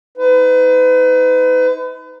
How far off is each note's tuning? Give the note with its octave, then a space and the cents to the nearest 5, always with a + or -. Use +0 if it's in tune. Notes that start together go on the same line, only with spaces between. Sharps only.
D#4 +35 B4 +40